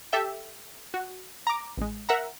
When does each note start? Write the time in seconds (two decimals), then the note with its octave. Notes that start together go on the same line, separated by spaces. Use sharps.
0.13 G4 A4 E5 G5
0.94 F#4
1.47 A#5 D6
1.77 A1 G#3
2.09 A#4 E5 F#5 A#5